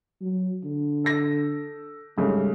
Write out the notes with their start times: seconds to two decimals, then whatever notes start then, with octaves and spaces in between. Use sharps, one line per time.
0.21 F#3
0.64 D3
1.04 A4 A#6
2.18 G#2 C#3 G3 A3